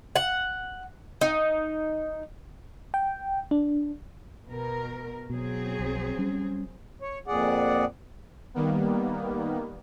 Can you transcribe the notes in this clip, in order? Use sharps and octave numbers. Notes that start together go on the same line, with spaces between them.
F#5
D#4
G5
D4
B2 A#4
B2 F#3 C4 G#4
B1
G3 C#4
C#5
F2 A#2 G#4 D5 F#5
D#3 G3 A#3 B3